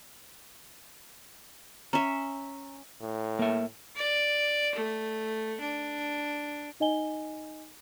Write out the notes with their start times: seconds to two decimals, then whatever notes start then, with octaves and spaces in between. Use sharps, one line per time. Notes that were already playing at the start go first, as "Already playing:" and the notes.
1.93 C#4 E5 A#5
3.01 A2
3.39 A#3 E5
3.97 D5
4.75 A3
5.60 D4
6.80 D#4 D#5 G#5 G7